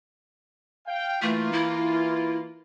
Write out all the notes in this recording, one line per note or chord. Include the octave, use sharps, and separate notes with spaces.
F5 G5
E3 A3 A#3 F4
E4